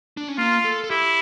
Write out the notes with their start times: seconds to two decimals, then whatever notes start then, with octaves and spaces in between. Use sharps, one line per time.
0.17 D4
0.28 C#4
0.38 A#3 F4
0.65 A4
0.84 A4
0.90 E4 G4